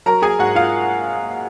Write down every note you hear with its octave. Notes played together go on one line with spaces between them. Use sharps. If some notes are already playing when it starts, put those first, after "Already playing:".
F#3 A#4 A#5
G#4 G#5
G#2 F#4 F#5
F4 F5